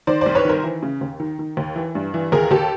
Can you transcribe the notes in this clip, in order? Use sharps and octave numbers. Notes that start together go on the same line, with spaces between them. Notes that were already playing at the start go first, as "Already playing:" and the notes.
D#3 C5 D5
C2 C5 D5
B4 C#5
D#3 A#4 C5
E3
C#3
D#2
D#3
D#3
D#2
E3
G2
E3
D#2 G#4 A#4
D#2 G4 A4